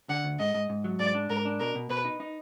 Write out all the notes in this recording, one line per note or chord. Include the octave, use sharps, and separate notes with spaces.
D3 F#5
D2
G#2 D#5
G#2
G#2
F#3
G#2 D5
D4
G#2 A#4
D4
B2 A#4
B2
B2 B4
D#4
D#4